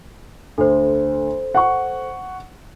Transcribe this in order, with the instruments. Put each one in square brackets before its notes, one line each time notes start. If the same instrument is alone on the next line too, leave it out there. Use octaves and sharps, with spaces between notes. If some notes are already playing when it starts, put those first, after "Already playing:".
[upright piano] D2 [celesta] A4 C5
[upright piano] F#5 C#6